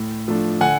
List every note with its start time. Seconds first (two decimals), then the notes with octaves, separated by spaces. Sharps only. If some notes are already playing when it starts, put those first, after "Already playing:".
Already playing: A2
0.28 F3 A3 D4
0.61 D3 F#5 G#5